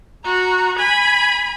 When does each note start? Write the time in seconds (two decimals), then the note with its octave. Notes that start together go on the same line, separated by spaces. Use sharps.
0.24 F#4 A#5
0.77 G#5 B5